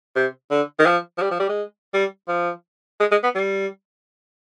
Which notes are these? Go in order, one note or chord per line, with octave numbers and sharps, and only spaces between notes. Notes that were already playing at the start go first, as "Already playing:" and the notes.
C3
D3
D#3
F3
F3
G3
F3
G3
G#3
G3
F3
G#3
G#3
B3
G3